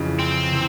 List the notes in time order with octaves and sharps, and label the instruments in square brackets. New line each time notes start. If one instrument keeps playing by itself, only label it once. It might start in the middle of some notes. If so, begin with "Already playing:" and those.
Already playing: [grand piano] F2 C#3 E3
[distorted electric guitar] C4
[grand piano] C3 E3